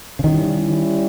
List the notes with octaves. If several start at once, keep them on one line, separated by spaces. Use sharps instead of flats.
C#3
D#3 G3 C#4 E4